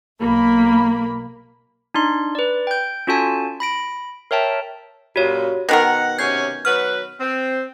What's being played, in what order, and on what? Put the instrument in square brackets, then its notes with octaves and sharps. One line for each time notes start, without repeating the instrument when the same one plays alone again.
[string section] B1 A#3 B5
[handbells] D4 D#4 C6
B4 D5
G5 G6
C#4 F4 F#4 A4 G#5 A5
B5 A#6 D7
A#4 C#5 E5 G5 A5
[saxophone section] F#2 A#2 [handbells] F#4 G4 C#5
[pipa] B2 D#3 A#4 [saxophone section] F#5 [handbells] A#6
[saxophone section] C3 F#3 C#4 [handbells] G6 G#6 C7
[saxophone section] F#3 F#4 B4 [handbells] F6
[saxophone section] C4